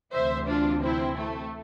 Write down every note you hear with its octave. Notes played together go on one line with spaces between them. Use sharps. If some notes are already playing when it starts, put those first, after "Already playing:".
D2 C3 E3 C5 E5
D4 F4
C4 E4
A3